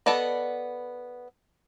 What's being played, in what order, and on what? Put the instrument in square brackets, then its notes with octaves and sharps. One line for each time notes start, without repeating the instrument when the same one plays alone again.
[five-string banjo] B3 A4 B4 D5 D#5